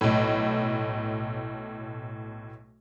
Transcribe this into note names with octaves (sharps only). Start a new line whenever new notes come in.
B1 A2